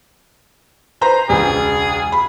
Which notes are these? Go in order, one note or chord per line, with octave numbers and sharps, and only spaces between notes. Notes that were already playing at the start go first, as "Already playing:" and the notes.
B4 C5 A#5
E1 C#2 G#4
B5